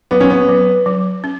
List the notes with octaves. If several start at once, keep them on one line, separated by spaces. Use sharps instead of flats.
F#3 B3
C#4
B3
F#3
F#3
C#4